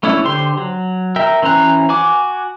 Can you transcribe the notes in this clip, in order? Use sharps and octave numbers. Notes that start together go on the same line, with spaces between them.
A3 C#4 D4 E4 C#5
D3 G4 C5 C6
F#3
A#4 E5 G5
E3 C#4 C5 A#5 F#6
F#4 G#5 D6